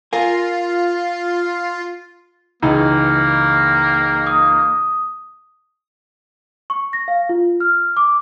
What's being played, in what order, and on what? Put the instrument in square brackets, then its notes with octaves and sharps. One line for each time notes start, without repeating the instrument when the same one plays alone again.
[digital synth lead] F4 [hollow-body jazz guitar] A#4 G#5
[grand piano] C#2 E3 D#4 [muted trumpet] A#3
[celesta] D#6
C#6
A#6
F5
F4
F6
D6